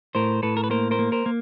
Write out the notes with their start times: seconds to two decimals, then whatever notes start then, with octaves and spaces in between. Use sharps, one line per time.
0.15 A2 A#4 C5
0.43 A2 A4 B4
0.57 A#4
0.64 B4
0.70 A#3 A#4 C5
0.91 A#4 C5
0.99 A#3
1.12 A#4 C5
1.26 A#3